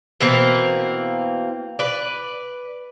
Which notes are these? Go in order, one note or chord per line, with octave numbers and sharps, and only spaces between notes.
B2 E3 A#3 C4
B4 D5